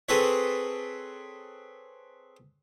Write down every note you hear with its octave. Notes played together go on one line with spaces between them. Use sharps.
C4 G#4 A4 B4 C#5